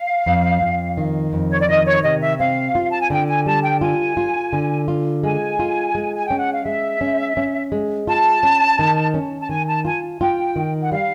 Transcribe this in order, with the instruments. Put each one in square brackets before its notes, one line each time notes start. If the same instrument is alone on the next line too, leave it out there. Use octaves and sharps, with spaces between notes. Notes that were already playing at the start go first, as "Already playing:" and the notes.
Already playing: [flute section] F5
[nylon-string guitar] F2
F2
D#3
F2
[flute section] C#5
D5
[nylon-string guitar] D#3 [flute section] D#5
[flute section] C#5
[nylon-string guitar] C3 [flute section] D#5
[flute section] E5
[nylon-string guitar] C4 [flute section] F5
[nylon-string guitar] F4
[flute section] A5
G#5
[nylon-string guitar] D3 [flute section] G5
[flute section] G#5
[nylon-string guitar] G3 [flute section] A5
[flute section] G5
[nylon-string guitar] F4 [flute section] G#5
[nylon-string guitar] F4
D3
F4
[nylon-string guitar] G#3 [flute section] G#5
[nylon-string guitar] F4
G#3
[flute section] G#5
[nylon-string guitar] C#4 [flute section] G5
[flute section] F#5
F5
[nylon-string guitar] G#3 [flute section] E5
[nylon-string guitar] C#4
C#4
G#3
[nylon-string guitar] F4 [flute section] A5
[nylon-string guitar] C#4
D#3
C#4
[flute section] A5
[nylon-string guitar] D#3 [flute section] G#5
[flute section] A5
[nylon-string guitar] F4 [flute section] G#5
[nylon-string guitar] F4 [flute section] G5
[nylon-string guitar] D#3
[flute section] F#5
[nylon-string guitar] G3 [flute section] F5